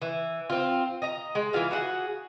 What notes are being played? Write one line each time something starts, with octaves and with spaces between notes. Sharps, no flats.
E3
C4 F4
D#5 A#5
G#3
E3 B3 F4 F5
F#4 G#4 D#5 F#5